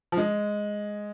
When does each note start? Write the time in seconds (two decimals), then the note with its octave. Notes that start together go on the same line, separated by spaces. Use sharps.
0.12 F3
0.17 G#3